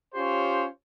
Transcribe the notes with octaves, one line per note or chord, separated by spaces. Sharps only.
C#4 F4 G4 C5 C#5